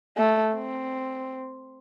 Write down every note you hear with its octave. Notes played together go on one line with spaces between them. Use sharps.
A3
C4